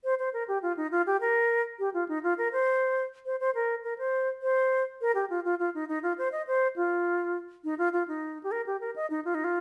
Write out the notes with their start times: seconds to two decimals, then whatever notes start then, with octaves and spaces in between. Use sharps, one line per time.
0.04 C5
0.19 C5
0.33 A#4
0.48 G4
0.62 F4
0.77 D#4
0.91 F4
1.07 G4
1.21 A#4
1.79 G4
1.94 F4
2.09 D#4
2.23 F4
2.38 A#4
2.52 C5
3.26 C5
3.40 C5
3.55 A#4
3.84 A#4
3.98 C5
4.42 C5
5.01 A#4
5.15 G4
5.30 F4
5.45 F4
5.59 F4
5.74 D#4
5.89 D#4
6.03 F4
6.18 C5
6.32 D#5
6.47 C5
6.76 F4
7.64 D#4
7.78 F4
7.93 F4
8.08 D#4
8.43 G4
8.52 A#4
8.67 G4
8.80 A#4
8.96 D#5
9.10 D#4
9.25 F4
9.35 D#4
9.44 F4